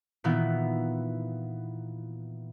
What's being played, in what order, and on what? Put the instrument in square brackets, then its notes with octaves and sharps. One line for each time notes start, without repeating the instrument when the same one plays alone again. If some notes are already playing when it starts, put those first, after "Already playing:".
[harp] A#2 D#3 E3 B3 E4